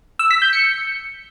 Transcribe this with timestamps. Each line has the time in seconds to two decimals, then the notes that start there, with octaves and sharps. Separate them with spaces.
0.19 E6
0.31 B6
0.42 G6
0.53 C#7